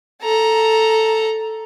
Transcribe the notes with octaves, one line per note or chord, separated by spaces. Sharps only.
A4 A#5